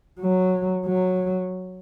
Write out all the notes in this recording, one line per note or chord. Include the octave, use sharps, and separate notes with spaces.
F#3
F#3